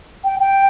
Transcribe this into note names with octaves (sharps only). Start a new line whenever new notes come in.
G5
G5